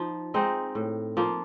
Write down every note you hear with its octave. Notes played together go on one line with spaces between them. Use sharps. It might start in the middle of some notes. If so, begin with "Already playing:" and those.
Already playing: F3 D#4
G#3 C4 D#4
A2
F3 A#3